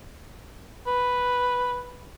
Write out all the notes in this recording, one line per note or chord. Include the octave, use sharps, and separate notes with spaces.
B4